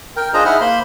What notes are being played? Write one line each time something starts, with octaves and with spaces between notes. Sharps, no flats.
A#4 G5
D4 F4 G#4 C5 D#5 A#5
D#4 E4 G#4 E5 F#5 F6
A#3 C5 B5 C6